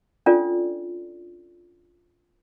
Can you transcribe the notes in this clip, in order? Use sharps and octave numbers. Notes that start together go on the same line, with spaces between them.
C#4 D4 F4 A4 D5